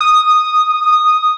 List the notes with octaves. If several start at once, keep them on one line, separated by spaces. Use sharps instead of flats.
D#6